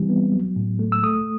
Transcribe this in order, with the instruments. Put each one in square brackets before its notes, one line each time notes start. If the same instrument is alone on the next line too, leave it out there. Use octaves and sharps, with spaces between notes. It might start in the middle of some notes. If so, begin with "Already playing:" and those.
Already playing: [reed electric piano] E3 G3 C4
B3
F#3
A2
A3
E6
A3 D#6